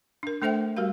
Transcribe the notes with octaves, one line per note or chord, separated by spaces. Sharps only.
D4 A#4
A3 D4 A4 C5 E5 G5
G3 F#4 G4 A#4 F5